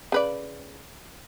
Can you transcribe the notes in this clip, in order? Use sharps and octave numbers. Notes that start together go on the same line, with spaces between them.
C#3 B4 D5